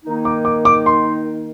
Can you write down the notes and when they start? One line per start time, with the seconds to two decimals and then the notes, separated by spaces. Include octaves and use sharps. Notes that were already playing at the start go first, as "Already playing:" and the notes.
0.05 D#3 A#3 D#4
0.25 D6
0.45 D6
0.65 D6
0.86 C6